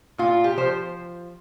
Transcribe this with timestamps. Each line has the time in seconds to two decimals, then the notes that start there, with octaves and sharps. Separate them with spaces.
0.18 A#2 F4
0.44 G4
0.57 F3 C5